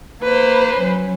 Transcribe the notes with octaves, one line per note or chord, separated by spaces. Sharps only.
A#3 B4 C5
F#3 C#4